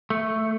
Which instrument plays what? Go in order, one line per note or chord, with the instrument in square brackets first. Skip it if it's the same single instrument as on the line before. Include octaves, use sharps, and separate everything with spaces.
[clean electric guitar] A3